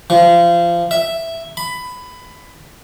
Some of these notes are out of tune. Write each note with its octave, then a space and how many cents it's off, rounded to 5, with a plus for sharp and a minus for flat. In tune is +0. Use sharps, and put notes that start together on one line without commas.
F3 -25
E5 +0
B5 +15